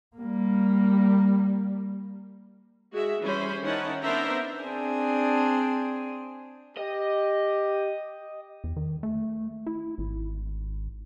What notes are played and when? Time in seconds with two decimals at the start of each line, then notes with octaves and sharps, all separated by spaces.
0.17 G3 A#3
2.92 G#3 F#4 G#4 E5
3.22 E3 G3 C#4 C5 B5
3.63 D#3 C#4 D#4 E4 F#5 A5
4.01 B3 D4 A#4 C5 E5 A#5
4.63 C4 D4 G#4
6.77 G4 D#5
8.64 E2
8.76 D#3
9.03 A3
9.66 E4
9.98 G#1